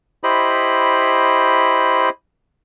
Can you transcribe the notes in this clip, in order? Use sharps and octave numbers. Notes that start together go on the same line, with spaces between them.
E4 G4 C5 D#5 B5